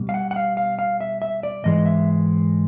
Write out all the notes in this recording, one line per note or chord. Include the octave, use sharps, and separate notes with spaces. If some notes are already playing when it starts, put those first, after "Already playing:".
Already playing: B2 G3
F5
F#5
F#5
F5
F5
F5
E5
E5
D5
G#2 E3 G#3 D#5
E5